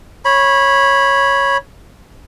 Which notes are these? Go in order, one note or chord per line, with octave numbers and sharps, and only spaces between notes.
C#5 B5